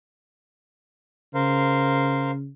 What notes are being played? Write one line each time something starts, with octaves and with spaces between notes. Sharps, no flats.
C#3 A#4 C5 F5